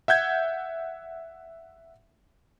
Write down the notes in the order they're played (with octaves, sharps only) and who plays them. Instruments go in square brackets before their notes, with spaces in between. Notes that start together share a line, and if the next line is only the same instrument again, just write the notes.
[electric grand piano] E5 F#5 G6 G#6